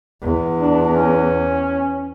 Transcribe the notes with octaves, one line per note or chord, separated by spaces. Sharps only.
E2
D4
C#4